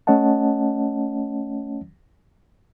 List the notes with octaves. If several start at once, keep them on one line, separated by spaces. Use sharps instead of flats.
A3 C#4 C#5 D#5 F#5 A5